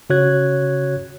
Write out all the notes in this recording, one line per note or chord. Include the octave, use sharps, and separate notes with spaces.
C#3 F#4 C#5 F#6 G#6